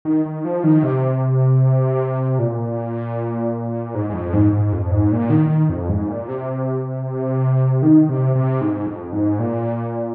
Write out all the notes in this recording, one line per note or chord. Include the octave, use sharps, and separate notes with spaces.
D#3
D#3
F3
D#3
C3
A#2
G#2
G#2
F2
G#2
G#2
F2
G#2
A#2
D#3
D#3
F2
G#2
A#2
C3
D#3
C3
C3
G#2
F2
G#2
A#2